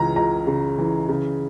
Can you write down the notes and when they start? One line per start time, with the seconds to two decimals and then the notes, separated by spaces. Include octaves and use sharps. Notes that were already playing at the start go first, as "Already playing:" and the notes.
Already playing: C#2 C#3 E3 A#5
0.16 C#2 A#5
0.47 C#3
0.78 E3
1.09 C#3